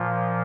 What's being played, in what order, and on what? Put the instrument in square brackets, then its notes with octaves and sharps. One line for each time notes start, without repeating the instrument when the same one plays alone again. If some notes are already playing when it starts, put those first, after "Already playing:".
Already playing: [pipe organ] A#2 F3